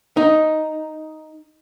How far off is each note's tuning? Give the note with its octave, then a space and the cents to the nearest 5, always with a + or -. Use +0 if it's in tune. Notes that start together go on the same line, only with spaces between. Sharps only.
D#4 +5